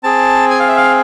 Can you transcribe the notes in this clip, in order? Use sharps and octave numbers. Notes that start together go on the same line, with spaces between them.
C4 G#4 A5
G#5
F5
E5
F5